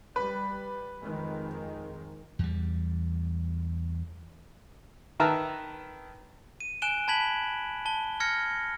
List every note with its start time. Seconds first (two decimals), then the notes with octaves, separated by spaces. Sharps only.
0.16 G3 B4
1.03 F2 D#3 G#3
2.39 E2 G3
5.20 D#3 B4 E5 A5 A#5 F6
6.60 D#7
6.82 G#5 F#6 D7 E7 G7
7.08 A5 B5 G#6 B6 F#7
7.86 A5 G7
8.20 F6 G#6 A#6 C#7